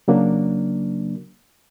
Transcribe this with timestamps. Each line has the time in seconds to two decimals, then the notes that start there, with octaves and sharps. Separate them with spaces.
0.08 C#3 F#3 A#3 D4